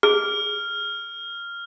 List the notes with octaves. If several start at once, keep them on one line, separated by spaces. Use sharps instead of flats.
G#4 F6